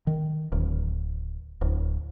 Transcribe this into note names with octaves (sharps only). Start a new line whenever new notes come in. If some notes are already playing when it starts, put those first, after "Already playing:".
D#3
D1
D1